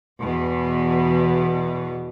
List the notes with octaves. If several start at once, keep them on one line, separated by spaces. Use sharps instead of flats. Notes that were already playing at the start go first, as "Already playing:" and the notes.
E2 B2